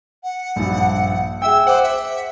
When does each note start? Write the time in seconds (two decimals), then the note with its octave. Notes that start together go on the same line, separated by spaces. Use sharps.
0.24 F#5
0.56 A#1 G2
1.42 G#4 E5 G5 E6
1.67 C5 F#5 D6 F#7
1.83 E5